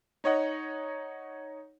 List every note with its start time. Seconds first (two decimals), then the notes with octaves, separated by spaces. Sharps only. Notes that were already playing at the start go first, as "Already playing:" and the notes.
0.24 D#4 C#5 D#5 F#5